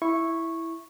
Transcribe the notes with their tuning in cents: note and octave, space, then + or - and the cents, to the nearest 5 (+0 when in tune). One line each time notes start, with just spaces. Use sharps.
E4 +0 C#6 -10